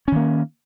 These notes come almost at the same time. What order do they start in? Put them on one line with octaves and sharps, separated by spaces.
C#4 D#3 A#3